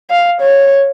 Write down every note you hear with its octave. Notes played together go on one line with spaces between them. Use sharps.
F5
C#5